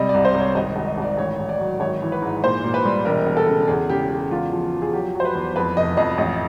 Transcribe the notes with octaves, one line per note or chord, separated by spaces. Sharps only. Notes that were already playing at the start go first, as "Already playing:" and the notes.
Already playing: C3 G3 D#5
D5
C2
C5
C2
C#5
G#1 D#5
G#1
D#5
G#1 D5
A1 C#5
A1
D5
F#3
G#1 C#5
E3
B4
G#2
A#2 C5
A#2
B4
G3
E1 A#4
E1
A4
C#3
E2 G#4
C#3 G4
C#3 G4
E2 F4
F3
F3
G#4
F#3 G4
F#3
C5
B4
E2
F2 B4
F1 D#5
F2 D#5
A1 D#5